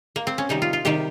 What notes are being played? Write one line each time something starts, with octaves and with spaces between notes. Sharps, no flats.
A#3
C4
C#4
C3 D#3 G3 D#4
F4
F4
C3 D#3 G3 G4